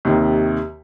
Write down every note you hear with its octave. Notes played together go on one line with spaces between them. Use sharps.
D#2 C3 D#3